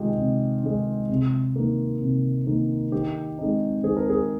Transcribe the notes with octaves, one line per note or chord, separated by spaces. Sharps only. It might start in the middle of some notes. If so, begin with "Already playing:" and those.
Already playing: C3 D#3 G#3 D#4 F4 G4
C3
D#3 G#3 D#4
C3
D#3 A#3
C3
D#3 A#3
D#3 G4
G#3 C4 D#4
D#3 G#4
A#4
G#4